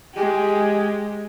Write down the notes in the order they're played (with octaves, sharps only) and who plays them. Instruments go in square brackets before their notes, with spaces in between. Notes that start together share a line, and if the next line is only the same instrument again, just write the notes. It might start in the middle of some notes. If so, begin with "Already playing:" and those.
[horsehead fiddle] G#3 G4